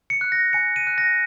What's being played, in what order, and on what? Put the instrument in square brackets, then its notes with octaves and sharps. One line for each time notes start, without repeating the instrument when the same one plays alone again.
[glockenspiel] C#7
F#6
A#6
G#5 C#7
D#7
F#6
A#6